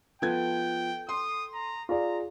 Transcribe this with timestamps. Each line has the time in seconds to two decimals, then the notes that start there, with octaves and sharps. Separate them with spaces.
0.22 F3 B3 A4 G5 G#6
1.09 C6 D#6
1.54 A#5
1.89 F4 G#4 D5 A#5